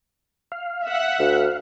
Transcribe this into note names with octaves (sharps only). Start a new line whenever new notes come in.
F5
E5 F#5
D2